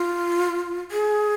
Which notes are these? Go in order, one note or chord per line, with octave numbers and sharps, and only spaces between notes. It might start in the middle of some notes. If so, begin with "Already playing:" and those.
Already playing: F4
G#4